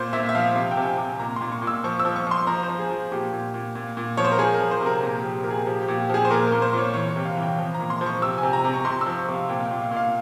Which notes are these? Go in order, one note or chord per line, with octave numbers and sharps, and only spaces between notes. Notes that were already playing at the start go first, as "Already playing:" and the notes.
Already playing: A#2 C5
A#2 E5
E5
F3 F5
C3 F5
G5
C3 G#5
G5
C3
G#5
A#2 A#5
A#2 C6
C#6
A#2
E6
F3 C#6
E6
F3
C#6
F3 C6
F3 A#5
C5
F3
G#4
F3
A#2 G4
A#2
A#2
A#2
A#2
F3 C#5
C5
A#4
F3 G#4
A#4
F3
C5
C3
A#4
A#2 G#4
G4
F3
G4
A#2 A#4
G#4
F3 G4
G4
A#2
G4
F3 G#4
C5
A#2 A#4
A#4
A#2
C5
A#2 C#5
E3 C#5
C#5
C3
F5
E3
G5
F3
A#2 A#5
C6
F3
C#6
C3 E6
G#5
C3
A#5
C3
C#6
C3 C6
E6
F3
C#6
C3
F5
A#2 G5
F5
G5
A#2
F5
A#2
F5